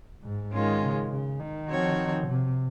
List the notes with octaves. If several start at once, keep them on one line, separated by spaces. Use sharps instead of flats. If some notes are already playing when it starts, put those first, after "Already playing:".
G#2
G#2 D#3 G#3 C#4 F4
C#3
C#3
D#3
F3 C4 F#4 C#5
C3